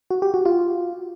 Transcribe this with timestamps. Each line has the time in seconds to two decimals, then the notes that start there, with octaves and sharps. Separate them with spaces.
0.10 F#4
0.22 G4
0.34 F#4
0.45 F4